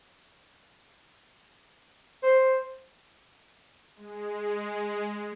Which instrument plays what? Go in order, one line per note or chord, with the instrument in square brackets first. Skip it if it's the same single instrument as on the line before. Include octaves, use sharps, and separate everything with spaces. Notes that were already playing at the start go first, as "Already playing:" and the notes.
[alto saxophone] C5
[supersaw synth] G#3